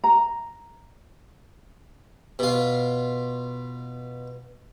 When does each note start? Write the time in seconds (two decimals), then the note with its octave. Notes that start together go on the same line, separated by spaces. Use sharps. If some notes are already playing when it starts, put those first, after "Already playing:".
0.04 A#5
2.39 B2 F4